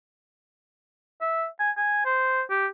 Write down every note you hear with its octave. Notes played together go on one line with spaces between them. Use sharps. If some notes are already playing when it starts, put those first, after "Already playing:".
E5
G#5
G#5
C5
G4